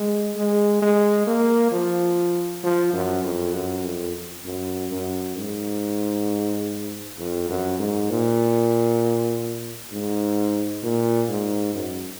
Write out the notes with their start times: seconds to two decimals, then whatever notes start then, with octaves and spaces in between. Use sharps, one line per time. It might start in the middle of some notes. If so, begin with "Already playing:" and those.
Already playing: G#3
0.36 G#3
0.82 G#3
1.27 A#3
1.72 F3
2.63 F3
2.93 F#2
3.24 F2
3.54 F#2
3.85 F2
4.45 F#2
4.91 F#2
5.37 G#2
7.18 F2
7.50 F#2
7.79 G#2
8.10 A#2
9.92 G#2
10.83 A#2
11.29 G#2
11.74 F#2